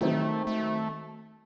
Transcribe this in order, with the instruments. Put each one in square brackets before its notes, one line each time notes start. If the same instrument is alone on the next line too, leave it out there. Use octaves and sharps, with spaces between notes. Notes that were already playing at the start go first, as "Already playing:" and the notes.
[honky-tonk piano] D#3 F#3 C4 D#4 [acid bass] A3
[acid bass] A3